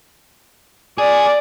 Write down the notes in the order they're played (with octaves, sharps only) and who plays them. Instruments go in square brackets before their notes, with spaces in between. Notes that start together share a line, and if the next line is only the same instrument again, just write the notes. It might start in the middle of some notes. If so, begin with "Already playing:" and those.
[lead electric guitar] G#4 [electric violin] D5